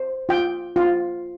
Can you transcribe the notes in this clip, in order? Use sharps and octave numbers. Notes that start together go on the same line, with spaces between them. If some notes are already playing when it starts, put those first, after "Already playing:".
Already playing: C5
F4 G5
F4